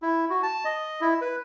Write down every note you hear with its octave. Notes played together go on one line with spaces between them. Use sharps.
E4
F#4
A5
D#5
E4
B4